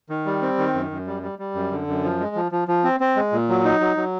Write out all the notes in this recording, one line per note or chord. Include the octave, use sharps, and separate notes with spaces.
D#3
G3
C4
D#3
F#2
F#2
G3
G3
G3
F#2
D3
F#2
F3
G#3
F3
F3
F3
C4
C4
G#3
A#2
F#3
D#4
F#3
F#3